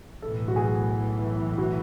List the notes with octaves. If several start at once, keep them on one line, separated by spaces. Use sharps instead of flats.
B1 A2 E3 A4
F#4
G#4
F#4